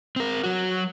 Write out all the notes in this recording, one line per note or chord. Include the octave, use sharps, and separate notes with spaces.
C4 A#4
F#3 F#4